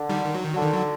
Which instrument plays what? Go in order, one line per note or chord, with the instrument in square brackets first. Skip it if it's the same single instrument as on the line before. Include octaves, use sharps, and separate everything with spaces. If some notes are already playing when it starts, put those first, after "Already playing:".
Already playing: [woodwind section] D3
[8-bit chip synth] D#3 G3
D#3
F#3
D#3
[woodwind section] D3 [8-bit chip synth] F#3
[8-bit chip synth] D#3
F#3